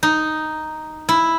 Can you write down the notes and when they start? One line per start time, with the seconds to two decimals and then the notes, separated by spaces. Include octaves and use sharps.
0.03 D#4
1.09 E4